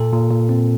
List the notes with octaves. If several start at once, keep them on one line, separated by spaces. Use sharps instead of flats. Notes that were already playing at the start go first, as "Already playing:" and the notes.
Already playing: A#2 A4
A#2
A#2
C4